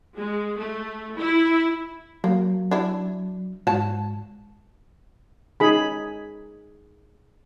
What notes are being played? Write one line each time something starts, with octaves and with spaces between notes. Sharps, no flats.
G#3
A3
E4
F#3 A#3
D4 E4
G#2 F#4 A5
D#4 G#4 B5